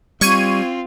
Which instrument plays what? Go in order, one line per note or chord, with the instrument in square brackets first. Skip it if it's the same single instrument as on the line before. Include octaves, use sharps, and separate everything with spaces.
[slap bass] G3 [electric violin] C4 F4 [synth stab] C#6 G#6 D#7